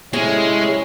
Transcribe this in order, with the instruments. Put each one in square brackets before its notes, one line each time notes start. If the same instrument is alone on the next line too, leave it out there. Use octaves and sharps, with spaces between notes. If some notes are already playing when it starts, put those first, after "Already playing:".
[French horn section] A2 C3 E4 [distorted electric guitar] G#3 [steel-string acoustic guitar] C#4 G#4 [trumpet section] C#5